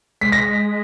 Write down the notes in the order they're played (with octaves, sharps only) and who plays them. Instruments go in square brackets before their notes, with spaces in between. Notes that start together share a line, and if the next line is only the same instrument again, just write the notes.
[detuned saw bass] G#3 [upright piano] B6
[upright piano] A#6